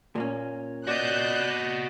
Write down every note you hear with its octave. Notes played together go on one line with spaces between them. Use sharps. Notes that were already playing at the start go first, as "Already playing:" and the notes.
A#2 A#3 C#4
F#4 D5 D#5 F#6 G6